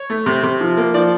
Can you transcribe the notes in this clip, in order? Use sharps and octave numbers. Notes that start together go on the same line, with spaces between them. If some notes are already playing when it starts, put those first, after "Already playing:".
Already playing: C#5
A3
C3
C3
F3
A#3
F3 D5